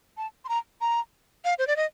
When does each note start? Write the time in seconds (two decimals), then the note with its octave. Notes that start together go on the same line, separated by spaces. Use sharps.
0.17 A5
0.45 C6
0.49 A#5
0.81 A#5
1.45 F5
1.58 C5
1.67 D5
1.76 D#5